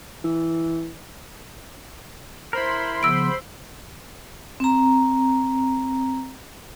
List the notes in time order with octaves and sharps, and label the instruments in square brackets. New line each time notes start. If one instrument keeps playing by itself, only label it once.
[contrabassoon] E3
[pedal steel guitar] E4 A#4 [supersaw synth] C5 B5 C6
[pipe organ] C#3 F3 B3 [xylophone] E6 D7
[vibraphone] C4 A#5